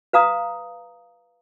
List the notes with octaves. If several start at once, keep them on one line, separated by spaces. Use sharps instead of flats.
B4 F5 A#5 D#6